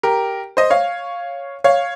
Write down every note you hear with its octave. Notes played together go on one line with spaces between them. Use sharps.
G4 A#4
C5 D#5
C#5 F5
C#5 F5